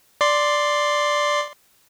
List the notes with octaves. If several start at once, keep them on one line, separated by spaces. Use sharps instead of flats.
D5 C6